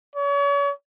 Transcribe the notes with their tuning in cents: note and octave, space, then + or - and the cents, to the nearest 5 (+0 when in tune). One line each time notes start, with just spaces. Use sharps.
C#5 +40